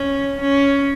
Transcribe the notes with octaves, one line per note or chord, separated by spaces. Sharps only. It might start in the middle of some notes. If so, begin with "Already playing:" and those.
Already playing: C#4
C#4